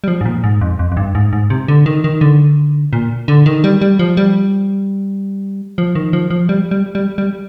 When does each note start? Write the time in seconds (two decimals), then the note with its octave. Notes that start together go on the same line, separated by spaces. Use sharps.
0.04 G3
0.08 F3
0.21 G#2
0.26 A#2
0.44 G#2
0.61 F2
0.79 F2
0.92 F2
0.97 G2
1.15 G#2
1.33 G#2
1.50 C3
1.68 D3
1.86 D#3
2.04 D#3
2.21 D3
2.93 A#2
3.28 D3
3.46 D#3
3.64 G3
3.81 G3
3.99 F3
4.17 G3
5.78 F3
5.95 D#3
6.13 F3
6.30 F3
6.49 G3
6.71 G3
6.95 G3
7.18 G3